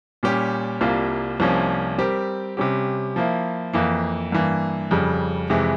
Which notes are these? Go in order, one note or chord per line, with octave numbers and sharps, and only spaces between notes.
A#2 G3 C#4 G4
C2 C3 G3 A#3 F4
C2 C3 F3 A#3 C#4
G3 C4 G4 A#4
C3 G3 C#4 G4
F3 A#3 E4
F2 E3 A#3
G2 E3 A#3
F2 C#3 G3
F2 C3 E3 G#3 E4